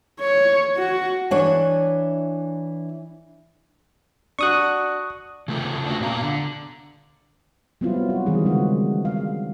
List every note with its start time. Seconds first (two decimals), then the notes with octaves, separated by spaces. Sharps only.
0.20 C#5
0.77 F#4
1.31 E3 D4 C#5
4.39 D4 F#4 C#6 D#6 F#6
5.48 C#3 A3 F4 A4
5.86 D4 F#4
6.00 A#2 B3 F5 A#5
6.22 D3
7.81 F#3 G3 B3 C4 E4 F4
8.09 F#4
8.26 D#3 E3 G3 F4 G#4
8.45 C#3 G3 G#3 C4 F#4
9.05 F5